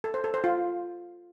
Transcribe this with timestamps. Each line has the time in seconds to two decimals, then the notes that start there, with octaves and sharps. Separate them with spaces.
0.04 A4
0.14 C5
0.24 A4
0.34 C5
0.44 F4